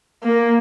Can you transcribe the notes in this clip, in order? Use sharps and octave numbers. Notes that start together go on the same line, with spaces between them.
A#3